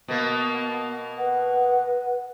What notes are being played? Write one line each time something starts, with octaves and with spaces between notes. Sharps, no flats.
B2 A#3 B3
B4 F#5